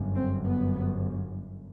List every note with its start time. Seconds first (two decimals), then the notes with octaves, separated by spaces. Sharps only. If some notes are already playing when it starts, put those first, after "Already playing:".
Already playing: G1 F#2
0.15 C4
0.44 B3